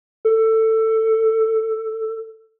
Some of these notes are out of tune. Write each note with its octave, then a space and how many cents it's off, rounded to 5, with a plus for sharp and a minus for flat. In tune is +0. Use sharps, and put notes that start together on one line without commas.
A4 +15